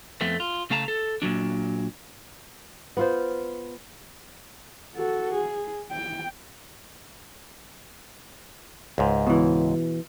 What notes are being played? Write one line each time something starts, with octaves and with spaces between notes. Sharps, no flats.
F2 A3 B3 C4
F4
C#3 A3 F5 A5 A#5
A4
A#2 E3 F#3 D4
B3 F4 C5
F#4 A4
G#4
G5
C#2 G#2
B2 E3